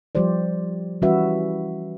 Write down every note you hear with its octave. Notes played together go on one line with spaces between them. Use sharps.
F3 G3 G4 C5 D5
E3 G3 C#4 F#4 B4 E5